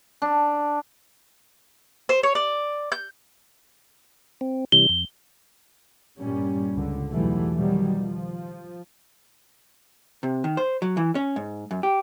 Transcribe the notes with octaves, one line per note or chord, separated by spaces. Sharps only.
D4
C5
C#5
D5
G6
C4
C3 E3 G3 G7
F2
G2 A#2 G3 C#4
C#2 D3
B1 E2 E3 F#3 G3 A3
B2 D#3 F#3 G3
F3
C3
D#3
C5
F#3
E3
C#4
G#2
F#2
G4